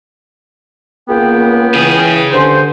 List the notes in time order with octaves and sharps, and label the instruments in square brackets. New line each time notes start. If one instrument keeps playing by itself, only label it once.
[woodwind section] C#2 B3 G5 [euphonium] A#3
[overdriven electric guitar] C#3 G#4 [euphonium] E3
[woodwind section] G2 C5 [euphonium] D3